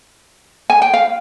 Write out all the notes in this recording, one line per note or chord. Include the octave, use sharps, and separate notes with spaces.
G#5
G5
F5